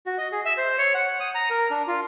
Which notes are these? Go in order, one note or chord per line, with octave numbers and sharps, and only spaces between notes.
F#4
D#5
G#4
E5
C5
C#5
F#5
D#6
A#5
A#4
D4
F4